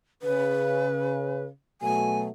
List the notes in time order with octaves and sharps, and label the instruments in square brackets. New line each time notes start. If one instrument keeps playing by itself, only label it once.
[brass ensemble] C#3 [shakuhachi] B4
[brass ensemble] B2 F#3 A3 [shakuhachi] G#5